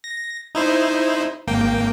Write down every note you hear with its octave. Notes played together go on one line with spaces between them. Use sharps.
A#6
D#4 E4 C5
G#1 A#3 G5